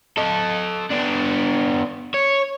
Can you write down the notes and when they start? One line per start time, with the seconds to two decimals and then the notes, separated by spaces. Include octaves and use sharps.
0.17 A4 D#5
0.91 B3 D4
2.14 C#5